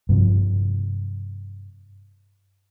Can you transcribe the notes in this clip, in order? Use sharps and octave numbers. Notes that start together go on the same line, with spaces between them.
G2 C3 F3